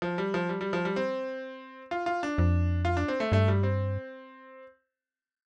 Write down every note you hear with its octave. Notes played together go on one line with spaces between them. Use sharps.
F3
G3
F3
G3
G3
F3
G3
C4
F4
F4
D4
F2
F4
D4
C4
A3
G2 A3
G3
C4